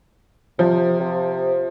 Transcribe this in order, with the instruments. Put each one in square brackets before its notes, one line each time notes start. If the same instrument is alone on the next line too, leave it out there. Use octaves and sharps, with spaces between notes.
[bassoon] C3 [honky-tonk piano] F3
[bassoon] C3